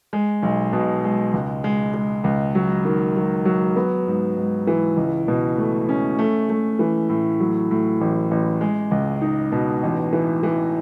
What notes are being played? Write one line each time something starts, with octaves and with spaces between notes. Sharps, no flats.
G#3
B1
B2
G#3
C#2
G#3
G#3
C#2
F#3
D#3
F#3
F#3
B3
G#2
G#2
E3
C#2
B2
A3
C#4
A3
A3
E3
A2
F#3
A2
A1
A1
G#3
C#2
D#4
B2
A1
E3
E3